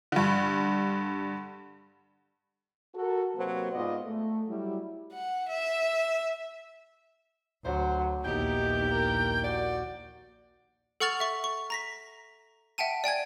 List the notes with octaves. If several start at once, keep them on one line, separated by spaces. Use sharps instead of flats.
G2 D3
F#4 A4 A#4
C3 F#3 A#3 B4 C5
G#2 B3 F4 D5 D#5
A3
F#3 G3 E4
F#5
E5
D2 F#3 C5
A#1 D#2 B3 D#4 E4 G4 G5
A#4
F#4 D5
A4 F#5 C#6 F6 A6 F7
E5 C#6
C#6
A#5 A#6 B6
E5 F#5 G5 A5 D#7
D5 G5 G#5 G#6